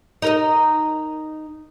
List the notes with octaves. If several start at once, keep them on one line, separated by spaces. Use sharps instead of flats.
D#4 A#4 D#5